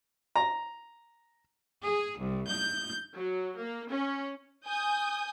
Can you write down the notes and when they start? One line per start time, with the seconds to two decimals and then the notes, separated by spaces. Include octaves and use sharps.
0.36 A#5
1.84 G#4
2.20 C2
2.49 G6
3.17 F#3
3.58 A#3
3.93 C#4
4.65 G#5 D#6 G6